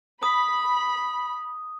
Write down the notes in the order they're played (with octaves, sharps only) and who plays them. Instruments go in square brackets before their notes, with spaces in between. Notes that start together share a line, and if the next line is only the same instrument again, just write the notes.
[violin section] B5 [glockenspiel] D#6